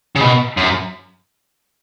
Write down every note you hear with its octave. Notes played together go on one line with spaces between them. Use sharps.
C#3
B2
F#2